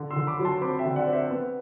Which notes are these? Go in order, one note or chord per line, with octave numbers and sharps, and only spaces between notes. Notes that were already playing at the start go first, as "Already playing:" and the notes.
Already playing: D3
C6 E6
D3
B5 D6
F#3
A5 C6
C4 B5 D6
E5 G5
D3
D5 F#5
C4
C5 E5
B3